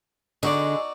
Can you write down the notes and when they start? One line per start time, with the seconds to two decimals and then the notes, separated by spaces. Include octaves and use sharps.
0.43 D3 G#3 D#4 F#4 D5